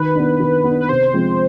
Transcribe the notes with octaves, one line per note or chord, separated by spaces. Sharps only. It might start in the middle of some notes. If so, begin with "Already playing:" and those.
Already playing: D#3 B4
B3 D4
D#3
B3 D4
B4
C3 C5
F3 G#3 C4 F4